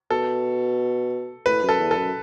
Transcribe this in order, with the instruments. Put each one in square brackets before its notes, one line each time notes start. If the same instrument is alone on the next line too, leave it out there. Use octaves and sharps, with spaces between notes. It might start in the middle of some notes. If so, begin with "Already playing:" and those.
[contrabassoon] B2 [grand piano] A4
[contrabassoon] A2 [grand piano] B4
[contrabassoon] F#2
[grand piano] A4
[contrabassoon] E2
[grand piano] A4
[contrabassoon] F#2